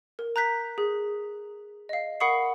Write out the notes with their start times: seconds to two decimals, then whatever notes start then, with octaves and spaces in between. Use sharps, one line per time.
0.19 A#4
0.36 A#5 F#6 G6 B6
0.78 G#4
1.89 D#5 F5
2.20 A#4 F#5 B5 C#6 D#6 C7